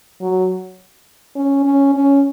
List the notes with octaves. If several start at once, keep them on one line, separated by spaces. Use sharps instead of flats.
F#3
C#4
C#4
C#4